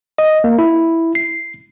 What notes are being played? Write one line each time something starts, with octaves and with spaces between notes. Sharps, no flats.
D#5
A#3
E4
C7